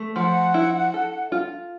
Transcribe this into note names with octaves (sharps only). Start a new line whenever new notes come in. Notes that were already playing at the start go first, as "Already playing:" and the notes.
Already playing: A3
F3 F#5
E4
A4
F4